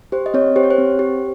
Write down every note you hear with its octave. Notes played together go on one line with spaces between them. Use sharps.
G4 C5
D#5
C4 C#5
G4 C5
C#5
C5
C4
G4